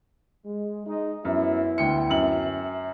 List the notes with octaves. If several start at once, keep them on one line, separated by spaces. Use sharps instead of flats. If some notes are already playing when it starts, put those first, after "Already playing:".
G#3
G#3 D#4
F#2 B3 E4
D2 G5 C#7
F#2 F#7